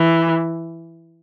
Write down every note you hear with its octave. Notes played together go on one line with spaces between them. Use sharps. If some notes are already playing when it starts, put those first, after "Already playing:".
Already playing: E3